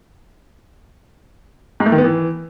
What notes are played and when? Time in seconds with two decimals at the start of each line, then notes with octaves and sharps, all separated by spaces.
1.80 G#2
1.86 A3
1.92 D#3
1.98 B3
2.04 E3